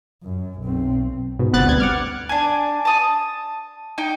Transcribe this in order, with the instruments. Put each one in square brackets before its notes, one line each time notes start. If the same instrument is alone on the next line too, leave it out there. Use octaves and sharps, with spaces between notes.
[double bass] F#2
B1 C4
[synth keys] G#2 B2
G1 C3 B3 F#6 A6
D2 G3 G#6
F#5 D6 F6
[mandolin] D4 G#5
A5 D#6
D#4 G5